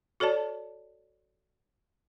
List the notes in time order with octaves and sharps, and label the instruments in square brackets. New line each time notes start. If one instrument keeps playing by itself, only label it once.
[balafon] F#4 A4 C#5 D5 A5